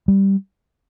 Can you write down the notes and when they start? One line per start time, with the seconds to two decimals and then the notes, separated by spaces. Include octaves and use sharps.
0.08 G3